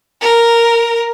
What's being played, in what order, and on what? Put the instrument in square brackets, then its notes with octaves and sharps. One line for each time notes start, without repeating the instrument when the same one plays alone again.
[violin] A#4